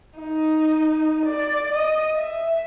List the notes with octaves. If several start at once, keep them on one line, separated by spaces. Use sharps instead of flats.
D#4
D5
D#5
E5